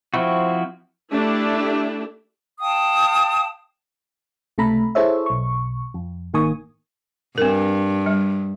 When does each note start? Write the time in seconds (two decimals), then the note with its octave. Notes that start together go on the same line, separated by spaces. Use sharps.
0.14 F3 C4 E4 F#4
1.12 A3 D4 E4 G4
2.61 F5 G5 A5 D#6
4.58 C#2 C3 A3 A4 A#5 B5
4.95 E4 G#4 A4 C5 C#5 E5
5.26 B1 C#6
5.94 F2
6.34 G#1 D#3 A#3 G#5 C#6 D#6
7.38 G2 C4 A#4
8.06 G3